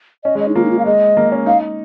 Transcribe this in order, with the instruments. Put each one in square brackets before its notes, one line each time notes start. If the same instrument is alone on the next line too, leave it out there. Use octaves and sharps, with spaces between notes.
[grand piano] C#4 [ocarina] D#5
[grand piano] G#3 [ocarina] D#5
[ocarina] D#4
[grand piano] A#3 [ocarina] F4
[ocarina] D#4
F4
F5
[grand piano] G#3 [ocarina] D#5
[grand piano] A#3
C#4
[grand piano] D#4 [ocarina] F5